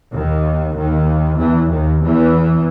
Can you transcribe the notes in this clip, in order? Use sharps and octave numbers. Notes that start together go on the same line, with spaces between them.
D#2 D#3
D#2 D#3
E2 E3
D#2 D#3
E2 E3